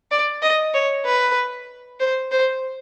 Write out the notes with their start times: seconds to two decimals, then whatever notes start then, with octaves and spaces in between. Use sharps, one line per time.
0.11 D5
0.42 D#5
0.74 C#5
1.06 B4
2.00 C5
2.32 C5